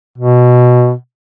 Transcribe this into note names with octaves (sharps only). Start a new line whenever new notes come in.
B2